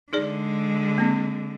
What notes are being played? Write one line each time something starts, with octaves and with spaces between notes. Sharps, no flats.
D3 G#3 D#4 G#4 D5
A#3 C4